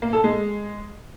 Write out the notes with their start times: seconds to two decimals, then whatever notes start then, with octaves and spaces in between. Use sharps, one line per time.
0.02 A#3
0.13 A4
0.24 G#3